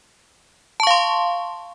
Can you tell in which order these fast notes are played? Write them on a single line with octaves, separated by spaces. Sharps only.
A5 C#6 F5 C6